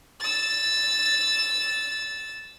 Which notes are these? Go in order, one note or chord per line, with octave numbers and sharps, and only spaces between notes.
E6 A6